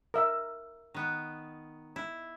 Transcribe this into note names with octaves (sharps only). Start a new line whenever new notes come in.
A#4 E5
D#3 B3
E4